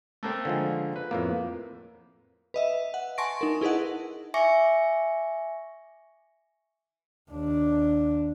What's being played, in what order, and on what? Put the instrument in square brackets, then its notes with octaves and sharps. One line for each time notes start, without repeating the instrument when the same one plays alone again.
[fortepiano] A3 A#3 C4
[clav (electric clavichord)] D3 F3 G#3
[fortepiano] B4
[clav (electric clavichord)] F2 A2 A#3 [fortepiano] B3
[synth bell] B4 D#5 E5
F#5
G#5 A5 C6 C#6 A#6 D7
D#4 A#4
E4 G#4 B4 D#5 F#5
[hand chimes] E5 G#5 C#6 D6 A#6 C#7
[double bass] D#2 D4